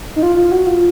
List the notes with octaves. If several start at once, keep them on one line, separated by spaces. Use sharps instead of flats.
D#4
F4
F4
F#4
F4